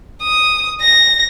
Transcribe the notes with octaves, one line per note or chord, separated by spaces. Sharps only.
D#6
A#6